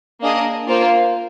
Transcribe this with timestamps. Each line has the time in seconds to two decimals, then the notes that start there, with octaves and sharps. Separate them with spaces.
0.21 A#3 D4 G#4 D#5
0.67 A#3 F4 C5